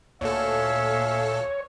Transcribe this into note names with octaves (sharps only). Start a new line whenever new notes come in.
D2 A#2 A4 C#5 E5 F5 G#5